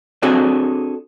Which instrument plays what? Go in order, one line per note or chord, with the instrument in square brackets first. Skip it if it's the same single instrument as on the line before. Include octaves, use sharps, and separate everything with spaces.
[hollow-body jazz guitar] C4 D4 F#4 G#4 A4 D5